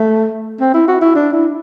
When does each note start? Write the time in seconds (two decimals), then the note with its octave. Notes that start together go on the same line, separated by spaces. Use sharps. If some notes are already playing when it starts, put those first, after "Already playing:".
Already playing: A3
0.60 C4
0.74 E4
0.88 F#4
1.01 E4
1.15 D4
1.33 E4